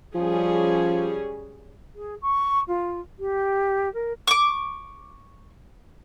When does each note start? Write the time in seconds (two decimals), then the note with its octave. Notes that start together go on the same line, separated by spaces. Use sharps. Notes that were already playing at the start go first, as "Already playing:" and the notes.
0.15 F3 G3 C#4 G#4
1.96 G#4
2.22 C#6
2.68 F4
3.19 G4
3.94 A#4
4.27 C#6 D6